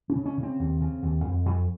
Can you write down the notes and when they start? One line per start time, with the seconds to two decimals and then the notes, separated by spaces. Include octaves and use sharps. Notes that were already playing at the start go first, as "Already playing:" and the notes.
0.10 C#4
0.15 C#3
0.26 C#4
0.37 C#3
0.43 C4
0.59 D#2
0.80 C#3
1.02 D#2
1.24 F2
1.46 F2